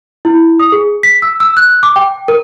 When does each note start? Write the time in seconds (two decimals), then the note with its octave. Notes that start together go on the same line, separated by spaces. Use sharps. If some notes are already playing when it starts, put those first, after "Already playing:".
0.25 E4
0.60 D#6
0.72 G#4
1.03 B6
1.22 E6
1.40 E6
1.57 F#6
1.83 D6
1.96 G5
2.28 A#4